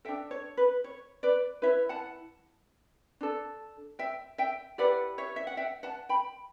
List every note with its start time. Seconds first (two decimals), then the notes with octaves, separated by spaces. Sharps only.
0.05 A4 E5 G5
0.09 D4
0.31 C#5
0.57 B4
0.84 C#5
1.23 B4 D5
1.62 E4 B4 C#5 E5
1.89 F#5 A5
3.21 D4 A4
3.99 E5 G5
4.38 E5 G5
4.78 E4 G4 B4 D5 F#5
5.18 C#5 E5
5.36 E5
5.47 F#5
5.57 E5 G5
5.83 F#5 A5
6.09 G5 B5